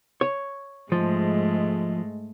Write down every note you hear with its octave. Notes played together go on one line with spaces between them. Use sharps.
C#5
G#2 F3 G#3 A3